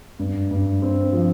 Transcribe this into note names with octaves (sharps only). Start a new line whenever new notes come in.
G2
G2
C4
F3